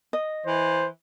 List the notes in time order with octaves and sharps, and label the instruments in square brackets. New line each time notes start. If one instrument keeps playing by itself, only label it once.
[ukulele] D#5
[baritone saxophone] E3 [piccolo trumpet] C5